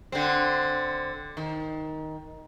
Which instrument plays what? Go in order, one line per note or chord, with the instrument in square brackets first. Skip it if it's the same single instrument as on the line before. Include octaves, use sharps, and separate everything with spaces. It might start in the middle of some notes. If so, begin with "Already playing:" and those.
[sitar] D3 C4
D#3